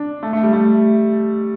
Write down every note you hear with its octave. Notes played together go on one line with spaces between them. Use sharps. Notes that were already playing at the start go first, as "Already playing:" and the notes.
Already playing: D4
A3
A3
G3
A3